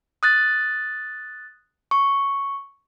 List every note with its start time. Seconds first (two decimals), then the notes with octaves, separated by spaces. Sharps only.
0.23 D#6 F#6 A6
1.91 C#6